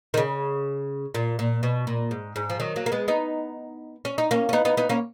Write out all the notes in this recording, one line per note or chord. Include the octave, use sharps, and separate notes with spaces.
D#3
C#3
A#2
A#2
B2
A#2
G#2
G#2
F3
D#3 F#3
F#3 A#3
A#3
G#3 B3
B3 D#4
C#4
D#4
A#3 C#4
C#4
B3 D#4
B3 D#4
B3 D#4
A#3 C#4